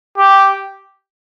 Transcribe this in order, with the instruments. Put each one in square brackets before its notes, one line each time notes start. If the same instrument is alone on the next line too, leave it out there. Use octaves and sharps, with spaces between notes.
[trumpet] G4